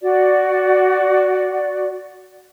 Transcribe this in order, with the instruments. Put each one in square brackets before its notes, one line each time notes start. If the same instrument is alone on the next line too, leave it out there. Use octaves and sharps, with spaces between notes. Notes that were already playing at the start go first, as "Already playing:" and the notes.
[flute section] F#4 D5